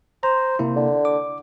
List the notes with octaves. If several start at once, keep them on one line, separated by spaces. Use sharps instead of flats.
C5 A#5
C3 A#3 E4
D3
D6